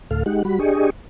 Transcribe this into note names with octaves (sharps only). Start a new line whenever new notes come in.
D2 A2 A4 F5
G#3 D#4 G4 F#5
G3 F#4 B5
D4 G4 G#4 D#5 C#6